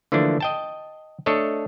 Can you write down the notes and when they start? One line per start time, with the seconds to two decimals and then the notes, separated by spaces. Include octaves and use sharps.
0.12 D3 E3 F3 A3 A#3 D4
0.41 D#5 G5 A5
1.26 A3 D4 A4 C#5 D#5